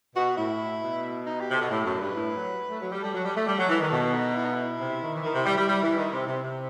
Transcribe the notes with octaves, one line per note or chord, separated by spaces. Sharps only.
B2 F#4
A2 E4
B2
D#4
G4
C3
B2 A4
A2 G4
F#2 A4
G2 B4
A2
F#3
A3
F#3
G3
G3 A4
F#3
G3
A3
G3
F#3
E3
D#3
B2 A4
D#4
E4
D#4
E4
C3
D#3
E3
D#3 E4
C3
G3
G3
G3
E3
D#3
C3
C3
C3